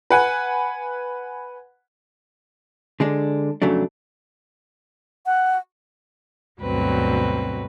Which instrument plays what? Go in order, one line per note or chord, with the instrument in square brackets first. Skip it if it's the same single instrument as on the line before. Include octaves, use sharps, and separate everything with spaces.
[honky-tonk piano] B4 F#5 G#5
[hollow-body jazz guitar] D3 G#3 D4
F2 C#3 F#3 A3 D4
[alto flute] F#5
[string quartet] D2 G2 B2 F#3 C4 B4